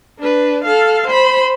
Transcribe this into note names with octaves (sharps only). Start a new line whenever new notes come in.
D4 B4
A4 F5
C5 B5